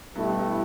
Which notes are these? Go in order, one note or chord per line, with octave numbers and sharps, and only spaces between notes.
G2 B2 A3 E4 G4
G2
G2